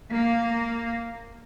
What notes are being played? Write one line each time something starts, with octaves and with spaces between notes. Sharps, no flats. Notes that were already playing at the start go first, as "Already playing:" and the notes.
A#3